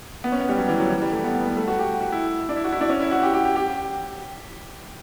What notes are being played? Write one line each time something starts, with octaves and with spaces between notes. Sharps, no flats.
B3
C#4
B3
G3
F#3
E3
F#3
E3
G3
A3
B3
B3
B3
A3
F#4
G4
F#4
E4
D4
E4
F#4
E4
D4
C#4
E4
F#4
G4
G4
G4
G4